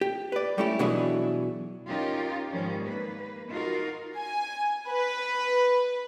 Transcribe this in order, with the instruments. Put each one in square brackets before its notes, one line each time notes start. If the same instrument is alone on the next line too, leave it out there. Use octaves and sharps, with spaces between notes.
[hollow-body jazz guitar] G4
B4 D5
G3 A3 C#4 E4 G4
B2 E3 F#3 D4 E4 G#4
[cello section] C#4 D#4 F4 G4 A#4
G#2 D#3 F3 G3 C#4
A#3 B4
D#4 F4 F#4 A#4
[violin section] G#5
B4